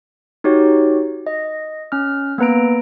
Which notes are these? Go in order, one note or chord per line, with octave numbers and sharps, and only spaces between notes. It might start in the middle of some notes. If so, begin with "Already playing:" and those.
D#4 F#4 G4 C#5
D#5
C#4 F6
A#3 B3 B4 A#5 D7